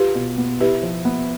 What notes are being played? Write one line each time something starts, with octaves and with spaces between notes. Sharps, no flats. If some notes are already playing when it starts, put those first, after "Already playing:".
Already playing: F4 G4 B4
B2
B3
E4 G4 B4
F3
B3